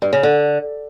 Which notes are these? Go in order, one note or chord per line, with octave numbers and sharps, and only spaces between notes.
G2
C#3
D3